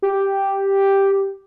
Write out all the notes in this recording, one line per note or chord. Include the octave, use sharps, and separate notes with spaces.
G4